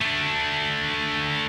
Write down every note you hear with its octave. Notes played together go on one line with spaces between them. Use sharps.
A3 D4